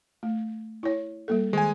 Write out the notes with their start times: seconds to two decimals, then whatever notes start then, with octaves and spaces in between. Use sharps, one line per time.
0.23 A3
0.83 E4 C#5
1.28 G3 A#3 A4
1.53 D#3 G#3 G#5